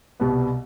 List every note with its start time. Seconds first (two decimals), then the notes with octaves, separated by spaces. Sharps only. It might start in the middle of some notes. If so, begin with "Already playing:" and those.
0.20 C2 B2 G3 B3